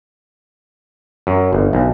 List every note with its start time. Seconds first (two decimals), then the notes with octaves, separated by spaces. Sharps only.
1.27 F#2
1.53 G1
1.73 B1